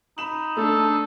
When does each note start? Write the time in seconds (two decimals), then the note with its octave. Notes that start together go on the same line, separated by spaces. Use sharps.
0.18 D#4 B5 E7 F#7
0.57 A3 D4 A4